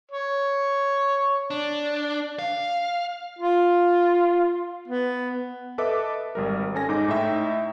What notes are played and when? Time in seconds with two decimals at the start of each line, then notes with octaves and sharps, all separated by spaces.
0.12 C#5
1.50 D4
2.39 F5
3.39 F4
4.88 B3
5.78 A4 B4 D#5 E5 D6
6.35 G#1 G3 A#4
6.75 C#4 A4 G#5 A#6
6.89 G#2 D#4 D6
7.08 A2 D#4 E5 G5